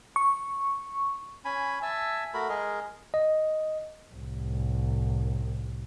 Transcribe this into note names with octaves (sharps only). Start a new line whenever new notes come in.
C#6
C#4 G#5 B5
E5 G#5 A5 E6
A3 F#4 A#4 B5
G#3 G#4 A#4 D#5
D#5
C2 A2